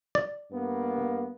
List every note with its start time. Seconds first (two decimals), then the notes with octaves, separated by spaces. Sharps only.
0.15 D5
0.52 G2 A#3 B3